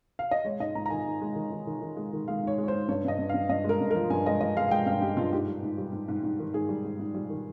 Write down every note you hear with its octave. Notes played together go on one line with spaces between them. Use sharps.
F5
D#5
G#3 C#5
G#2 D#5
G#2 A#5
A#5
D#3 G#5
G#2
G#3
D#3
D#3
D#3
D#3
G#3
D#3
G#3 F5
G#2 C#5
G#3
C#5
G#2 C5
G2 C#5
G2 D#5
G2
G2 F5
G2 D#5
G#3
A#4
G2
F3 A#4
G2 G#5
G#3 D#5
G#3 D#5
G#3 F5
G#3 G5
G2 F5
G2 G4
G2 F4
G#2 G4
G3
G#2
G3
G#2
G#2
G#2
D#3
G#2 G#4
G3
G#2
G#2
G3
D#3